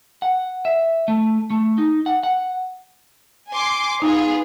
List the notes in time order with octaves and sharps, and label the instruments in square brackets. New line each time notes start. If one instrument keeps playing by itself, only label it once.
[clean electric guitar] F#5
E5
A3
A3
D#4
F#5
F#5
[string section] G#5 C6 D6
[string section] B3 F4 G#4 [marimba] D#4